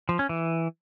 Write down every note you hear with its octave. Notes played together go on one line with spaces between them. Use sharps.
F3
C#4
E3